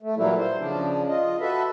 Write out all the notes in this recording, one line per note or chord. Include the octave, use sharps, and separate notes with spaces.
A3
A#2 E3 F#3 G3 A#3 E4
C5
C#3 F3 D4
F4 D#5
F#4 A4 B4 E5